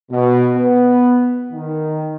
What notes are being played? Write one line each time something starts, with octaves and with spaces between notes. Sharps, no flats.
B2
B3
D#3